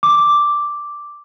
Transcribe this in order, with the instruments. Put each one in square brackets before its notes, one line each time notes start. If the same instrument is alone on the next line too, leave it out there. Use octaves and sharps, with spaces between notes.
[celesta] D6